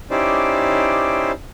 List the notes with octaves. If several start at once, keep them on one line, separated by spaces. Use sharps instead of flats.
C#4 D#4 E4 G4 C5 D5